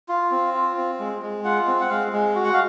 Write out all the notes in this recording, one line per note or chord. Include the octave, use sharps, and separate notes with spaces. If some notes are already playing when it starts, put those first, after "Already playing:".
F4
C4
F4
C4
G#3
G#3
F4 F#5
C4
F#5
G#3 F5
G#3
F#4
F#5
F5